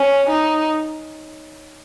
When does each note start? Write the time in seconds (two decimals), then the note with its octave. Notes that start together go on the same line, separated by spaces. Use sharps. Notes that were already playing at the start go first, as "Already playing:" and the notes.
Already playing: C#4
0.30 D#4